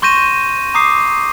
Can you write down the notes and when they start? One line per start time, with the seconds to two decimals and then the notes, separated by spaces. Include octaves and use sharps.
0.02 C6 C#6 G6 A#6 D#7 E7
0.74 A#5 D6 D#6 C7